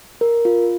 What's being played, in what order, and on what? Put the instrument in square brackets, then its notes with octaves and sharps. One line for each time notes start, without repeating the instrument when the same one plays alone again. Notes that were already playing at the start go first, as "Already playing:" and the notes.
[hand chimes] A#4
F4